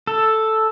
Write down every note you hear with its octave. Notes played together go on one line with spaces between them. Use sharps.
A4